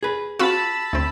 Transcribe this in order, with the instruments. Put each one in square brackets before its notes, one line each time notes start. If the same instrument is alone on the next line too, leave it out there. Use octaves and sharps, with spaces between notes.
[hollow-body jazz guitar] G#4 B4
[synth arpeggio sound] C4 F4 F#4 [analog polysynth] A5 B5 E6
[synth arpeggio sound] D2 C4